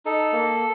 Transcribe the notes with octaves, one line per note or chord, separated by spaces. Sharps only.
D#4 A4
A#3